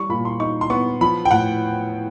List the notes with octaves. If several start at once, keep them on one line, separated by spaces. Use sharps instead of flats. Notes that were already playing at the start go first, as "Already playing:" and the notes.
Already playing: G3 C#6
A#2 B5
C6
D#4 C#6
C6
B3 C#6
F3 B5
G5
A2 F#5